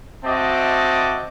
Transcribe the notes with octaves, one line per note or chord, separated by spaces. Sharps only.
C4 F#4 D#5 E5 A5 D6